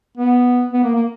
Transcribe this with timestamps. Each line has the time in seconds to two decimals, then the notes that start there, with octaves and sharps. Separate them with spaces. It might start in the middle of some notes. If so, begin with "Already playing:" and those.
0.18 B3
0.73 B3
0.84 A#3
0.95 A#3